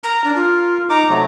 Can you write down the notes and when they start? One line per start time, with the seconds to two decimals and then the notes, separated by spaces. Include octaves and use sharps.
0.04 A#4 A#5
0.24 D4
0.36 F4
0.89 D#4 A#5 D6
1.09 C3 F#3 A3